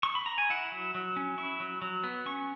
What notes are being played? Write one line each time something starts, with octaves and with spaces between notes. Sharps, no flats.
C#6
B5
A#5
G#5
E4 F#5
F#3
F#3
C#4
E4 C#6
F#3
F#3
B3
C#4 C#6